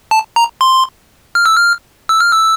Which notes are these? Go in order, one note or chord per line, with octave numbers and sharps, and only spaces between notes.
A5
A#5
C6
F6
E6
F6
E6
F6
E6